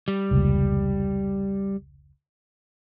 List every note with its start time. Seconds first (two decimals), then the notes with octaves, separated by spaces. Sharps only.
0.08 G3
0.31 F1 C#2 A#2